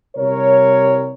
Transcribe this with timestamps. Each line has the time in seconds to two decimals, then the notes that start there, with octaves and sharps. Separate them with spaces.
0.16 C2 C3 G3 A#4 C#5